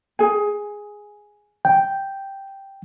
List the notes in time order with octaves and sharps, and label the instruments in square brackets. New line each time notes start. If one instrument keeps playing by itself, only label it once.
[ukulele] G#4 G#5
[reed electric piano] G5